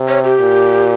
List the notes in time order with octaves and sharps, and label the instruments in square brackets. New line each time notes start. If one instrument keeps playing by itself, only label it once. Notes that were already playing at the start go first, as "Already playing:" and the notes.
Already playing: [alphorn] C3
[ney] C#5
G4
[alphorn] A#2